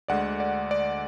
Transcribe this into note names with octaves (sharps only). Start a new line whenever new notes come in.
D2 D3 G#3 D5 F#5
D5
D5